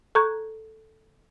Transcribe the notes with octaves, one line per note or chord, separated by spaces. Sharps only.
A4 A#5 C#6 G6 G#6